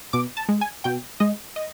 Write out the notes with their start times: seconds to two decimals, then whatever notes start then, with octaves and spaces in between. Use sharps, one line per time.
0.13 B2 D6
0.37 A5
0.49 G#3
0.61 G#5
0.84 B2 G5
1.20 G#3 D#5
1.56 D#5